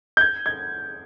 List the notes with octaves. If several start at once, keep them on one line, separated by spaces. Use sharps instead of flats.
G6
G#6
G#6